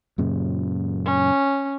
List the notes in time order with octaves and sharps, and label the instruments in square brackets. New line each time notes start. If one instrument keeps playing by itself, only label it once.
[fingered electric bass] F#2 A#2 C#3
[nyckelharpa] C#4